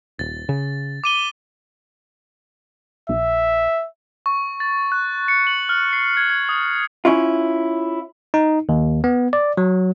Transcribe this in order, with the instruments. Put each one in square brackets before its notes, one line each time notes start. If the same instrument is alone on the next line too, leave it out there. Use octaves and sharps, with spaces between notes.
[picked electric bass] D#1 [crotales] A6
[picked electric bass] C#3
[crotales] D6 D#7 G7
[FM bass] A#1 [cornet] E5
[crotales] C#6
A6
F#6
C#7
F#7
F6
C7
G#6
G#6
D#6
[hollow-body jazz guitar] C#4 E4 F4
[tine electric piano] D#4
D#2
B3
D5
F#3